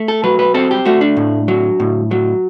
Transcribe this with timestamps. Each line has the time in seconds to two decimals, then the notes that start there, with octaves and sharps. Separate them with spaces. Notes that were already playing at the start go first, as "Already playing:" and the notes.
Already playing: A3
0.08 A4
0.24 F#3 B4
0.39 B4
0.54 C4 A4
0.71 G4
0.85 A3 F#4
1.01 D4
1.17 A2
1.48 F#3
1.80 A2
2.11 F#3